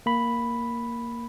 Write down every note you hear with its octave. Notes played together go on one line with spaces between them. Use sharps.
A#3 B5